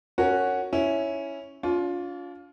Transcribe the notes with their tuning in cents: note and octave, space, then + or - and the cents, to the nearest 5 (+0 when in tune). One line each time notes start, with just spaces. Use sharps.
C#4 +0 F#4 +0 A#4 -20
C#4 +0 E4 +0
D4 -45 F4 +15